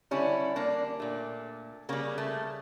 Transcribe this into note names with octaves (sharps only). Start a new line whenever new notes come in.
D3 G3 C#4 E4
A#3 D4
A#2 A3
C#3 G3 A#3
A3